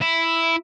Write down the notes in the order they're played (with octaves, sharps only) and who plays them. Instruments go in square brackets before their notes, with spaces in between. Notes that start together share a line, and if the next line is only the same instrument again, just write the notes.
[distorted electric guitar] E4